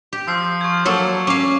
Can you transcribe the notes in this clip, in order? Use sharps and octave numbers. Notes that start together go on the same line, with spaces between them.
G4
F3 E6 C7
C#6 G#6
F#3 A#3 A4 C#5
C#4 F5 D6